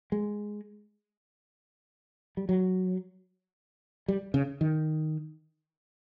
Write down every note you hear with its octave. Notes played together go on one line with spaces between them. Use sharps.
G#3
G3
F#3
G3
C#3
D#3